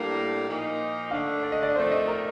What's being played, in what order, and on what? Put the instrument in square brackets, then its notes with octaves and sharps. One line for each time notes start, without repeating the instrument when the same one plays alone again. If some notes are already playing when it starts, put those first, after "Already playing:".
Already playing: [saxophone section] A2 G3 A#3 D4
A#2 F3 A#3 D#4
[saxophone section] D3 A3 D4 [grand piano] F5
[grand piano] D5
D#5
D5
[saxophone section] F2 D#3 A3 [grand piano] C5
[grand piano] D#5
A#4